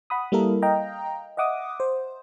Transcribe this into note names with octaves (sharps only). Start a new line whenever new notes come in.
F#5 B5 D#6
G3 A#3 E4 A4 A#4
D#5 F5 G5 A#5
D#5 E5 F#5 D6 D#6
C5